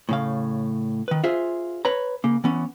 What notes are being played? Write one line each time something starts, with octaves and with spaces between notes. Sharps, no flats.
A2 C#3 F5
D#3 B4
F4 G#4 C5 E5
B4 C#5 A#5
C#3 A#3
E3 B3 C#4